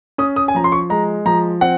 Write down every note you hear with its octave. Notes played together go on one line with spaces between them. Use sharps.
C#4 D#6
D#6
G#5
F3 A#5
C6
C#6
G#3 A#5
F3 A#5
C4 F#5